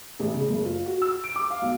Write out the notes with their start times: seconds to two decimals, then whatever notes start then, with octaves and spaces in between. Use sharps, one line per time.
0.19 A1
0.34 C#3
0.50 F#1
0.65 F4
0.86 F#4
1.02 E6
1.24 D7
1.36 D6
1.50 F5
1.62 B1